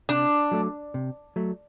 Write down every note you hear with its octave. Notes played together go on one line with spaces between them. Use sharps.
C3 D4
F#3 A3
C3
F#3 A3